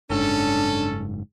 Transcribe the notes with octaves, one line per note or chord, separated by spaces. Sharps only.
F#1 G#2 C#4 D4 A4